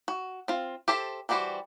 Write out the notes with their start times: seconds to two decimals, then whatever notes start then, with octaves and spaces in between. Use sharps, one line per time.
0.08 F#4
0.48 C4 F4
0.88 G4 A4 C5 E5
1.29 E3 G3 F#4 G4 C5